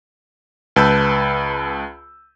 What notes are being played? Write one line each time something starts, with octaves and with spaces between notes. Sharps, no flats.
C#2 B4 A5 B5 E6 G6